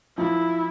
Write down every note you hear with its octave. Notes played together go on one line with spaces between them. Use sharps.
F3 E4